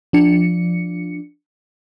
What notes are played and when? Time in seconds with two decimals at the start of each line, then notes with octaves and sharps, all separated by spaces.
0.13 F3 D4 C#7